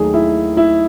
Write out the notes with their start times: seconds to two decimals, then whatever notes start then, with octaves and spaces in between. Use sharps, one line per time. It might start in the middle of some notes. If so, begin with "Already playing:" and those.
Already playing: D#2 D#3 F#3 A3 G#4
0.14 E4
0.57 E4